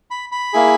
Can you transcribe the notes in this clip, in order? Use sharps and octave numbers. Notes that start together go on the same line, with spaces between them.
B5
B5
A#3 E4 G#4